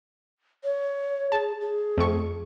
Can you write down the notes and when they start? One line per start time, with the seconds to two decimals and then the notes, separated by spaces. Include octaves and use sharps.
0.64 C#5
1.32 G#4 A5
1.61 G#4
1.97 F2 A3 C#6